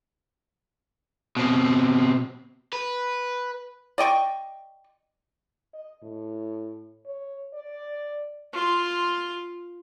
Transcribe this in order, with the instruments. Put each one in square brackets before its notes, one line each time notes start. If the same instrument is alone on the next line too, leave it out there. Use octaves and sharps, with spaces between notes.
[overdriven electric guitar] B2 C4
B4
[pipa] D5 D#5 G5 C#6
[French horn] D#5
A2
C#5
D5
[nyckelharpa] F4 C6